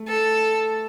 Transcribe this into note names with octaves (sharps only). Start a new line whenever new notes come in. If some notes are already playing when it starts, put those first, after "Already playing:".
Already playing: A3
A4